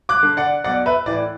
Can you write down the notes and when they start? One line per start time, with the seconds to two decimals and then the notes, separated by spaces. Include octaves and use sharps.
0.09 D6 F#6
0.23 D3
0.37 D5 F#5
0.64 B1 D5 F#5
0.86 B4 E5
1.06 A2 E3 D5